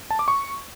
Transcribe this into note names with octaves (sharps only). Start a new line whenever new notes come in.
A5
D6
C#6